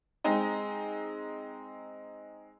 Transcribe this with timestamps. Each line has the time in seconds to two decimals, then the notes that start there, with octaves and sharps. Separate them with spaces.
0.24 G#3 C4 D#4